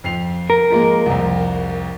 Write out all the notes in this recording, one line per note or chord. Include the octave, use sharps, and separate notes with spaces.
F2 C7 F7
A#4
F3 G#3 A#3
C2 F2